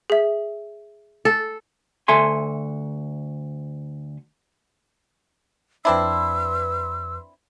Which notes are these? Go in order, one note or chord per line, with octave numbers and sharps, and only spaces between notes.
G#4 E5
A4
D2 A4 E5 G#5 C6
F2 C4 D4 E4 B4 C6 E6